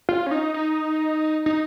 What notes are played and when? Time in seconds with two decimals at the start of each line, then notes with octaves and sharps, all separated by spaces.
0.09 F4
0.26 C#4
0.31 D#4
0.54 D#4
1.46 D#4